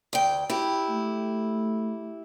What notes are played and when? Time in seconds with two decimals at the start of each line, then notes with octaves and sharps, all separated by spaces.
0.13 D2 G5
0.50 E4 G4
0.90 A3